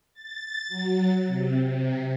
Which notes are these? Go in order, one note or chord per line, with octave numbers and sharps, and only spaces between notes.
A6
F#3
C3
C3